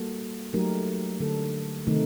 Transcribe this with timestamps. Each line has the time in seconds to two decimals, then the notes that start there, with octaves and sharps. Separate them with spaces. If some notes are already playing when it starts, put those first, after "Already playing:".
Already playing: G3 A#3 F#4 A4
0.53 F#3 A3 D#4 G4 A#4
1.20 D3 A3 D4 A4
1.87 C3 D#3 A3 C4 D#4